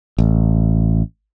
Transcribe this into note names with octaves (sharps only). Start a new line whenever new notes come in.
A1